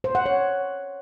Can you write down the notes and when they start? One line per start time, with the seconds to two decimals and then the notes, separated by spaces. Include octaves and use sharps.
0.04 C5
0.15 F#5
0.26 C#5